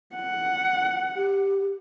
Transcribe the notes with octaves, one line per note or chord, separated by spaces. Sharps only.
F#5
G4